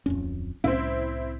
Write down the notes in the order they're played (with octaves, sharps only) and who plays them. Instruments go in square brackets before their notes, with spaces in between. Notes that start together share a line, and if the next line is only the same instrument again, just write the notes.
[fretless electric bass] D1 F2 C#4
[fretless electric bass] C2 A2 C#4 [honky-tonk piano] C4 E4